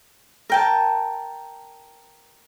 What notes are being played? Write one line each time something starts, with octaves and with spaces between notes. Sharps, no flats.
A#4 G5 A5